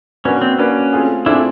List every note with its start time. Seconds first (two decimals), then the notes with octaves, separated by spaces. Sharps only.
0.25 A#3 C#4 D4 F#4 B4
0.42 C4
0.59 A#3 C#4 D4 F#4 B4
0.92 A3 C4 F4 G#4
1.26 A3 C4 D4 E4 F4 G#4